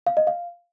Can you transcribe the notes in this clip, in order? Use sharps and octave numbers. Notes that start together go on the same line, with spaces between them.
F5
D#5
F5